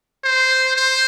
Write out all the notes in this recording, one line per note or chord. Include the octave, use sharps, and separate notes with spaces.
C5
C5